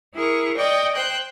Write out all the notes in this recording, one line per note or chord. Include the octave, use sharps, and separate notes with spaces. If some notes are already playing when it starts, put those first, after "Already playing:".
E4 G#4 A#4 C#6
D5 D#5 G5 C#6 D#6
C5 G5 F#6 G6